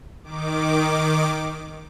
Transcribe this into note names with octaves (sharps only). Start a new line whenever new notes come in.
D#3 D6